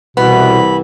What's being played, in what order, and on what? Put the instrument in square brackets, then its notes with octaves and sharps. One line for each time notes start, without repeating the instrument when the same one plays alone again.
[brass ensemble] C2 E3 [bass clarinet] B2 [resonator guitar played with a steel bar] B3 [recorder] B5